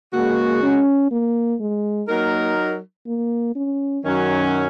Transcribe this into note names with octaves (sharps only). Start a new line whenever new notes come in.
C#3 G#3 A#3 F#4
C#4
A#3
G#3
F#3 A#3 D#4 A#4
A#3
C#4
F#2 D#3 F#3 C#4